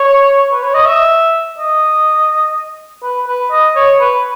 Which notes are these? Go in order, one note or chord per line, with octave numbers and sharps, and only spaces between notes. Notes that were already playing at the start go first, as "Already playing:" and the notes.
Already playing: C#5
B4
C#5
D#5
E5
D#5
B4
B4
D#5
C#5
B4